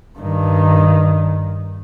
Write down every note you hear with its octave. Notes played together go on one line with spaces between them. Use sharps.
G2 D#3